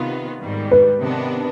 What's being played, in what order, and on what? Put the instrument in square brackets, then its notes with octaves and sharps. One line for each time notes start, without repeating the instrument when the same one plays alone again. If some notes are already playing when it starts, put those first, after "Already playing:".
Already playing: [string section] C3 D#3 B3 F4
G#2 D#3 G3
[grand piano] B4
[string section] C3 D#3 B3 D4